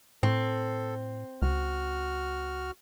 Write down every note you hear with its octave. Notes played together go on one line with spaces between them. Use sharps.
A2 C4 A4
C#2 F#4 F6